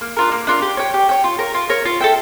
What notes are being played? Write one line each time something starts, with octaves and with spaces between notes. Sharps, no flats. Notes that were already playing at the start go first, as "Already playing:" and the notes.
A#3
D4 F4 A#4
A#3
D4 F4 A#4
G4
C#5 G5
G4
C#5 G5
F4
A#4 C#5
F4
A#4 C#5
F4
A4 E5 G5